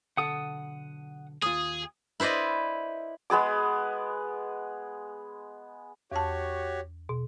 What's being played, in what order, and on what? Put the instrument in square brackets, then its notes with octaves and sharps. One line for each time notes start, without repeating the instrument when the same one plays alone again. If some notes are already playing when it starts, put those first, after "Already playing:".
[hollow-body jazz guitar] B1 D3 A4 [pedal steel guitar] F#5 D#6
[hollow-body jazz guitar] D#2 F4 [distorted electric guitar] G#4 [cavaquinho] D#6
[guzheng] E4 B4 C5 D5 D#5
[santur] G#3 B3 G#4 D6
[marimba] E2 A5 [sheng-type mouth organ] F#4 G4 C#5
[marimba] B2